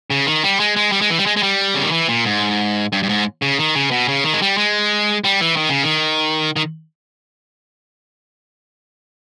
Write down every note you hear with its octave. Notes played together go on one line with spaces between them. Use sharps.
C#3
D#3
G3
G#3
G#3
G3
G#3
E3
G3
G#3
G#3
G3
C#3
D#3
E3
A#2
G#2
G2
G2
G#2
C#3
D#3
C#3
B2
C#3
D#3
G#3
G3
G#3
G3
E3
D#3
C#3
D#3
D#3